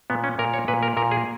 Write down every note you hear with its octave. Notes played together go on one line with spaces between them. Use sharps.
A#2 B3
C#4
A#2 A#4
C#5
A#2 B4
A#4
A#2 A#4
G#4